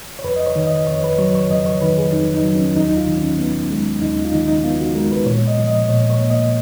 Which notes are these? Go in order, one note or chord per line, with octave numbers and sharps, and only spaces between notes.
C#5
F2 B4
D#5
C#5
D#3
D#5
F2 C#5
B4
F#3 C#5
C#5
F2 D#5
C#5
D#3 B4
G#4
F2 D#4
D#4
F#3
C#4
D#2 D#4
D#4
F4
D#3
C#4
B3
G#3
D#2 D#4
D#4
F4
D#3 D#4
D#4
B3 F4
F#4
G#3 A#4
B4
A#2 C#5
D#5
F3
D#5
A#2 C#5
C#5
A#3
D#5